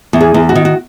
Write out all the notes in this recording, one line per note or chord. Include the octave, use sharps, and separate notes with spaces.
E2
G#4
E2
F#4
D#3
F#4